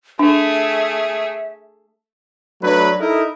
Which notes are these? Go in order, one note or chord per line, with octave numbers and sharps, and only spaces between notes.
A3 D4 G#4 E5
F#3 A3 D4 B4
D#4 E4 A4 A#4 D#5